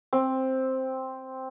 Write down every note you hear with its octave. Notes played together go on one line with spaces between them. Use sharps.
C4